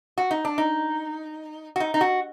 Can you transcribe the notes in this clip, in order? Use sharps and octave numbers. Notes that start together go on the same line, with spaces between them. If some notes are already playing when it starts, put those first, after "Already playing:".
F#4
D#4
D4
D#4
F#4
D#4
D#4
F#4